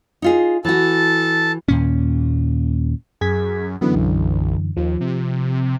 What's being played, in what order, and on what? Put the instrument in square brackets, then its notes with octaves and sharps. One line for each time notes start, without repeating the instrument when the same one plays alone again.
[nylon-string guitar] D#4 F4 G#4
[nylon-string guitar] E3 F#4 [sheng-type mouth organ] A4 A5
[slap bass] D#2 A#2 C#4
[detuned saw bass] F#2 [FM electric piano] G#4 G#6 B6
[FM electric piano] F#2 D3 E3 [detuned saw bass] B3
[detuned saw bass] B1
[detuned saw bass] D#2 [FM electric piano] F3
[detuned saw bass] C3